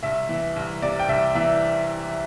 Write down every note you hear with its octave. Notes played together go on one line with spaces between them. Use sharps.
C2 E5
E3
C2
C3 D5
G5
C2 E5
E3 E5